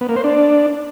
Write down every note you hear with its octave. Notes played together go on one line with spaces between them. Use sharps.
B3
A#3
C5
D4